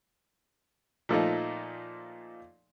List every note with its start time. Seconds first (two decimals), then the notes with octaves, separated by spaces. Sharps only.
1.09 A#2 F3 A3 D#4